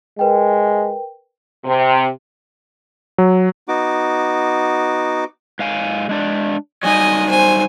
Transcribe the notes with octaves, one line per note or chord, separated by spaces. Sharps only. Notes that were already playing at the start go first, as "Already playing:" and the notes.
G#3 A#4 B4 G5
C3
F#3
B3 D#4 F#4 D6
G#2 F5 G#5
G#3 D4 D5
F#3 G3 D#4 D#5 G#5
C5 G#5